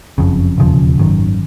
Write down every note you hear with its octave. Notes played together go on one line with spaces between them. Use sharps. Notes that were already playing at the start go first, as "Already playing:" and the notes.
F#1 F2 C#3
E1 D#2 C#3 F3
G#1 F#2 D#3